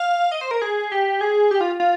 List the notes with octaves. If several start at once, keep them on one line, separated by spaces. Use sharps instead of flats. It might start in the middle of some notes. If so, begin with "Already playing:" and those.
Already playing: F5
D#5
C5
A#4
G#4
G4
G#4
G4
F4
F4